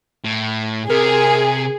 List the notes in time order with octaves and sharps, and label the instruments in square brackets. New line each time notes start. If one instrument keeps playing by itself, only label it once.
[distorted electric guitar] A2
[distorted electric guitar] C3 [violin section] G#4 [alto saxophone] A#4